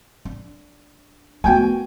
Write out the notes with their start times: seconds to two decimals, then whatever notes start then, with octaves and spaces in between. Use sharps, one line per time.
0.25 D4
1.44 A3 B3 F#4 G5 G#5